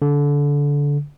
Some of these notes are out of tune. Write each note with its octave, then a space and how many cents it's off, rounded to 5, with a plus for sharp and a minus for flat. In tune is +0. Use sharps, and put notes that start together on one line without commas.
D3 -25